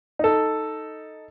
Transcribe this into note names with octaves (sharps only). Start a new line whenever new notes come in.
D#4 A4